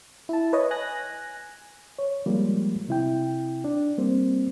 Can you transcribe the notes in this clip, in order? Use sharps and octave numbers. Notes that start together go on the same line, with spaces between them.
E4 A5
B4 C#5 D#5
G#5 F#6 A#6
C#5
F3 G3 G#3 A#3
C3 E4 G5
D4
G3 A#3 C4